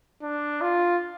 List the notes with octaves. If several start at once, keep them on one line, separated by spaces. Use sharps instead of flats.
D4
F4